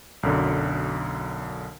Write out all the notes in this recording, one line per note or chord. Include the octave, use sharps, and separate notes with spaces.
B1 F#2 D3